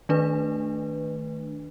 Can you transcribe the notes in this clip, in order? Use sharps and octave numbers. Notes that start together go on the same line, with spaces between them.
D#3 A3 D4 B4